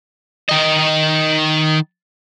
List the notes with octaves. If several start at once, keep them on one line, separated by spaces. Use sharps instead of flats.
D#3 D#5